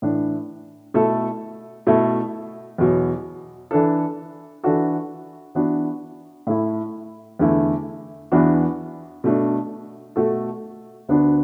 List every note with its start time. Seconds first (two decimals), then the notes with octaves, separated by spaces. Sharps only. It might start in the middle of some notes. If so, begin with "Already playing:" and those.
0.02 A2 E3 D4
0.94 B2 A3 E4 A4
1.87 B2 A3 E4 A4
2.78 E2 B2 F#3
3.71 E3 D4 A4
4.63 E3 D4 F#4 A4
5.55 E3 B3 D4 F#4
6.47 A2 A3 E4
7.39 E2 D3 A3 E4
8.32 E2 E3 B3 D4 F#4
9.24 B2 A3 D4
10.16 B2 A3 F#4 A4
11.08 D2 D3 B3 D4 F#4